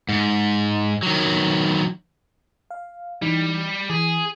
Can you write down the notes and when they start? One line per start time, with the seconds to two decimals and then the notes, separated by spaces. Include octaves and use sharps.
0.09 G#2
1.03 D#3 F#3
2.71 F5
3.22 E3 G3 D#4
3.90 E3 G#4